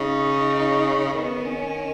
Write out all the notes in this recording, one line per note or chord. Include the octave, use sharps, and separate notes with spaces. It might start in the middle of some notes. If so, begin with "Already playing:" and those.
Already playing: C#3 D#4
D#3 B3
C#4